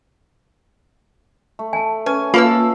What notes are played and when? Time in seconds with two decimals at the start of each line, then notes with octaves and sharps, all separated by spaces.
1.59 A3
1.73 G#5 A5
2.06 C#4 B4 G#5
2.34 A#3 F4 B4 F5 A5 E6